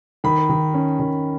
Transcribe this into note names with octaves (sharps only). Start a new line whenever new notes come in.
D#3 B5
D#3
C#4
D#3